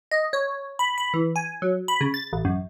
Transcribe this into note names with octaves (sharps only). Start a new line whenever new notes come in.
D#5
C#5
B5
B5
E3
G#5
F#3
B5
C#3
A6
A1
F#2